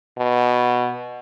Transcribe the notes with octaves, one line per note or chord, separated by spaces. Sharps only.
B2